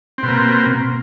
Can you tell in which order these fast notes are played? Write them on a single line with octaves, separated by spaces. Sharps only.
C4 B2 A#3